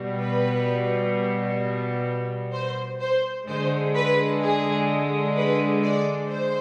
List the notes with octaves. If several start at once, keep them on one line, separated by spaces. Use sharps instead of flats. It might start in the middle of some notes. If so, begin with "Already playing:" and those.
Already playing: B2 G3
B4
C5
C5
D3 G#3 C5
B4
G#4
B4
D5
C5